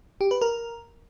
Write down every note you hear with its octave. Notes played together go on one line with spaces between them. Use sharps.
G4
B4
A#4